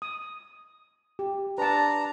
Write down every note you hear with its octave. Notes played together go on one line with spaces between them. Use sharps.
D#6
G4
D4 B4 A5 A#5